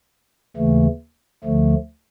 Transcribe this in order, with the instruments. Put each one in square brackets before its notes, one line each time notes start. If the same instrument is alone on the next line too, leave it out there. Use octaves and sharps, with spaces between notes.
[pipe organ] D#2 C#3 E3 A3
D2 D3 F3 A3